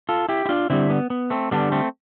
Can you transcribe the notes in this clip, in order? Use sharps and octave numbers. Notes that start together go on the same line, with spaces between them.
F4 A4
E4 G4
E4
D4 F4
D3 G3 C4 E4
B3
B3
A3 C4
D3 G3 B3 D4
A3 C4